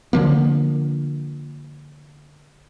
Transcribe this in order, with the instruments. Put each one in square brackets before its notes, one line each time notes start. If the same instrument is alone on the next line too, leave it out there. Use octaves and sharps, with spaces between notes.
[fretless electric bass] D3 F3 A#3